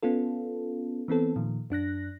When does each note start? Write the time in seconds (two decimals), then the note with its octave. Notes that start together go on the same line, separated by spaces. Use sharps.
0.03 B3 C#4 F4 A4
1.08 E3 B3 C4 A4
1.36 A#2 D#3 F3
1.70 F#2 D4 F#6 A#6